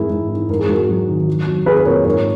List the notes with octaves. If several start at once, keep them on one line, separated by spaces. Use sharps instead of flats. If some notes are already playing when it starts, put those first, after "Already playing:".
Already playing: G#2 E3 E4 G#4 A#4
G#2
E3
G#2 A#4
G#4
G#2 F#4 A#4
F#3
D#3
F#3
F#3
F#3 G#4 B4
B4
A#2 A#4 C#5
G#2 A#4 C#5